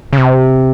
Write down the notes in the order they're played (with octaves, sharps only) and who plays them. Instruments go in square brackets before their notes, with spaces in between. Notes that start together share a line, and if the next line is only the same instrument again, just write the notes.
[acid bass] C#3
C3